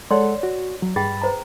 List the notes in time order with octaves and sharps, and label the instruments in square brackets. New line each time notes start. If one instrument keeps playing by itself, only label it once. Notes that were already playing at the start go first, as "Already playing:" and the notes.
[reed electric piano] G#3 A4 F#5 [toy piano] C#5 D5 C6
[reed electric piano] F#4
F#3
[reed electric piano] G2 B5 A6 [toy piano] G#4 G5
[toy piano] B4 C5 A#5